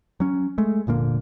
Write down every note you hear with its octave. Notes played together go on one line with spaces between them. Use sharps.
F#3 C#4
G#3 A3
F1 A#2 D3 A#3